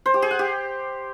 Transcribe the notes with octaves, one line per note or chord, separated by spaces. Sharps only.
C5
G4
G#4
F#5
G4